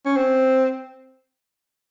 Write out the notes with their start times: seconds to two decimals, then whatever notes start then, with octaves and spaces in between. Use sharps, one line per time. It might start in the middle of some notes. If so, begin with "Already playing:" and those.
0.06 C#4
0.17 C4